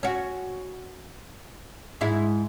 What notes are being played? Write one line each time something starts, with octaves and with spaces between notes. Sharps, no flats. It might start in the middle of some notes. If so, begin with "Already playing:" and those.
C#4 F#4
G#2 G#3 E4